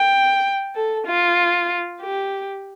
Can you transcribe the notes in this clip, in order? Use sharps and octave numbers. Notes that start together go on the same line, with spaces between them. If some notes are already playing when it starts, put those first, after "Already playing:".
Already playing: G5
A4
F4
G4